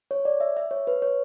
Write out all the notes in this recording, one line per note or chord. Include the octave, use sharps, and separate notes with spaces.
C#5
D5
E5
E5
C#5
B4
C#5